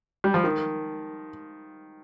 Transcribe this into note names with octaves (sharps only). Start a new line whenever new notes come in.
G3
F3
D#3